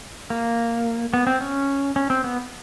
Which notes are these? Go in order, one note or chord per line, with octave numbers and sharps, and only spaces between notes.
A#3
B3
C4
C#4
C#4
C4
B3